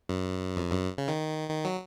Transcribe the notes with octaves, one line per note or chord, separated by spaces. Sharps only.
F#2
F2
F#2
C#3
D#3
D#3
F#3